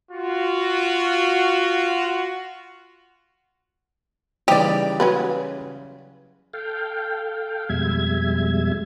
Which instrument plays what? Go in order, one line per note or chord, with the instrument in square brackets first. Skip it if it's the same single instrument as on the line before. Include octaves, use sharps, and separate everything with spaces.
[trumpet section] F4 F#4
[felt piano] C#3 E3 G3 [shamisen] D#4 [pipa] G4 D5
[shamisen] F#3 C#4 B4
[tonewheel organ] A4 F5 G5
F2 B2 G3 G#3 E5 G#6